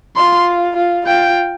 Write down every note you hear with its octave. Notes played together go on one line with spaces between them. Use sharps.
F4 C6
F4
F4 G5